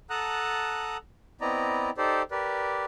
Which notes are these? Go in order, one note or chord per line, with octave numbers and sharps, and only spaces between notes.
A4 F#5 A5 A#5 D#6 F#6
B3 C4 E4 D5 D#5 A#5
D#4 G4 A4 C5 D5
G4 A#4 B4 D5